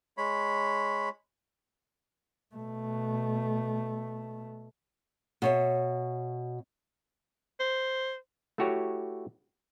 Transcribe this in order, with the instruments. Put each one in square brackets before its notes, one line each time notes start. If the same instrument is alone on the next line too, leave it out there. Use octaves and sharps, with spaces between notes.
[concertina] G#3 C#5 B5
[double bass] B2 A3
[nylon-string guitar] B2 C#5 E5
[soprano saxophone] C5
[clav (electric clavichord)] A3 E4 F#4 G4 C#5